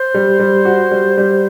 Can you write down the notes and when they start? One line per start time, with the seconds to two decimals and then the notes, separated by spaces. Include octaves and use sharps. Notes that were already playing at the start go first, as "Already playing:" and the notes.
Already playing: C5
0.14 G3
0.39 G3
0.65 F#4
0.91 G3
1.17 G3